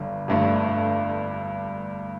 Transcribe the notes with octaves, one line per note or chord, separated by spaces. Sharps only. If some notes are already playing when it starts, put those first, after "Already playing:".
Already playing: G1 G2 D3
G1 G2 D3 A3